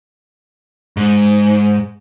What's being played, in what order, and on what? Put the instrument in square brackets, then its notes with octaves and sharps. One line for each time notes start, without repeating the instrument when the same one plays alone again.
[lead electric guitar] G#2